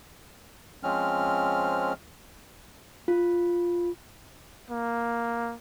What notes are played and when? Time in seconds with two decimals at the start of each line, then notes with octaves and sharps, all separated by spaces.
0.83 F3 G#3 C4 C#4 F6
3.08 F4
4.70 A#3